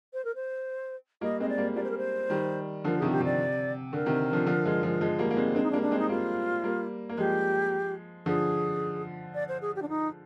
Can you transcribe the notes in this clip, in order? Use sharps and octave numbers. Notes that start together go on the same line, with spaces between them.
C5
A#4
C5
G3 A#3 D#5
G#3 C4 D#5
D5
G3 A#3
G3 A#3 D5
C5
A#4
C5
D#3 G3
D3 F3 A#4
C3 D#3 G#4
G4
C3 D5
D3 A#4
C3 D#3
D3 F3
D3 F3
F3 G#3
F3 G#3
F3 G#3
G3 A#3
A#3
G#3 C4
G#3 C4 D4
D#4
D4
G3 A#3
D4
G#3 C4
D#4
G3 A#3 F4
G3 A#3
A#3
F3 G#3 G4
D3 F3 G#4
D5
C5
G#4
G4
D4
D#4